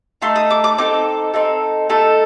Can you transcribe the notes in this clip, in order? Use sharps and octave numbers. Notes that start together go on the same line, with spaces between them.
A3 D#4 A4 C6
D#6
D6
D6
C4 D#4 A4 D6
C4 D#4 A4
A3 D#4 A4